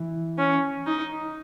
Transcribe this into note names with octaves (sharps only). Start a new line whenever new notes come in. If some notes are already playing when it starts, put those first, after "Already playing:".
Already playing: E3
C#4
D#4